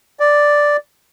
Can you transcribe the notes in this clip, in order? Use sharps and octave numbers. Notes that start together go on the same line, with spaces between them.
D5